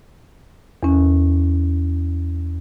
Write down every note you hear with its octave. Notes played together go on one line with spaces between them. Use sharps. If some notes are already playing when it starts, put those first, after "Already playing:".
E2 C#4